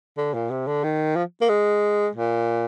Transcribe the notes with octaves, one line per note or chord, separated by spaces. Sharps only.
D3
A#2
C3
D3
D#3
F3
A#3
G#3
A#2